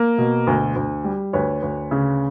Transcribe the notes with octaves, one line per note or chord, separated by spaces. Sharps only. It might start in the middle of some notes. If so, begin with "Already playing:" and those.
Already playing: A#3
B2
D2
D2
G3
D2 B4 C#5
D2
C#3